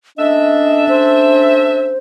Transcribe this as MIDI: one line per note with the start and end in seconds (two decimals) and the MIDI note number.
0.18 1.98 57
0.18 1.98 61
0.18 1.98 62
0.18 0.85 75
0.18 1.89 76
0.89 1.98 72